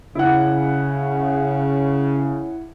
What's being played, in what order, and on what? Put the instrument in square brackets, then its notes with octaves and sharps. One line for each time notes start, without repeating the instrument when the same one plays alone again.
[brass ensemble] C#3 [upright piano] E4 F#5